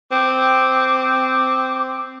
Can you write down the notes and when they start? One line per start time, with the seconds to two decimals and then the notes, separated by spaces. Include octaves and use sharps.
0.11 C4 D6